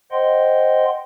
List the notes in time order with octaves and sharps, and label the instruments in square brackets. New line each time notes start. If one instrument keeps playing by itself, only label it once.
[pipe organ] C5 D#5 F#5 G5 C6